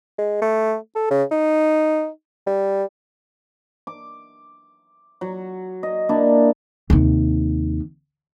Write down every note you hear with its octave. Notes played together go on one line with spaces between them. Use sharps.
G#3
A3
A4
C#3
D#4
G3
D6
F#3
D#5
A#3 D4 E4 D5
D#2 C3